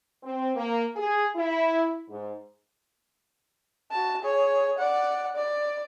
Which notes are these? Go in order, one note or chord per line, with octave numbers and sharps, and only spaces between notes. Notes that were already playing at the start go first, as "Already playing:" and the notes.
C4
A#3
G#4
E4
G#2
F#4 A5
G#4 C#5
D5 F#5
D5